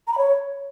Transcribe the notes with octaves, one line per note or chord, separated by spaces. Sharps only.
A#5
B5
C#5